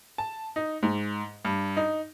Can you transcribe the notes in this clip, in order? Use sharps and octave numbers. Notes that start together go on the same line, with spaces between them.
A5
D#4
G#2
G2
D#4